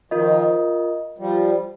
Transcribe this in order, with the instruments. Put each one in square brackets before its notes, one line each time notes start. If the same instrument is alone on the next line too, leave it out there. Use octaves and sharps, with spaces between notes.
[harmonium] D#3 F3 [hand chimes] F4 A#4 D#5
[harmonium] F3 G3